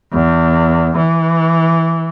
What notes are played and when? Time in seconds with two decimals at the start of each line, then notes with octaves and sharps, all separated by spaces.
0.13 E2
0.97 E3